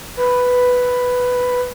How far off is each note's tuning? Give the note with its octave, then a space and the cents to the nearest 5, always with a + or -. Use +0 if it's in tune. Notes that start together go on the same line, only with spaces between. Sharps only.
B4 +5